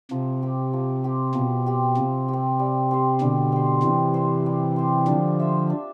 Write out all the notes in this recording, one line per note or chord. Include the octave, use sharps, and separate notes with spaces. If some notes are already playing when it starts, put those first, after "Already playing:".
C3 F3
C4 G4
F3
C4 G4
B2 F3
C4 G4
C3 F3
C4 G4
G3
C4 G4 C5
B2 D3 G3
C4 G4 C5
C3 E3 G3
C4 G4 C5
G3
C4 G4 C5
D3 F3 D4
F4 C5 E5
D4